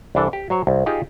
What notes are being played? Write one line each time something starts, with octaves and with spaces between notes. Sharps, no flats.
C2 E3 D4 A4
G4
F#3 C5 C#5
C2
D#4 F4 G4 G#4 D#5